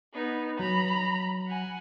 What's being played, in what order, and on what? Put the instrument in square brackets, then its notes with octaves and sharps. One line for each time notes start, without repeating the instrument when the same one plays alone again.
[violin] B3 D#4
[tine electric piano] F#3 [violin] A#5 B5
[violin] F#5 G#5